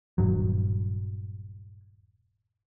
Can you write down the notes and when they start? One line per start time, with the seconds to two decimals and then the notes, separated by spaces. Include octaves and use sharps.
0.18 D#1 E2 G2 F#3